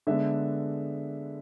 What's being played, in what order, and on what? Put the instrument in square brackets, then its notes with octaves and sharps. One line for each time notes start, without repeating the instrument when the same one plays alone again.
[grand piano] D3 G#3 B3 E5